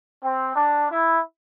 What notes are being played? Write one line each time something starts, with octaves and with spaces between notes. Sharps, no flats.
C4
D4
E4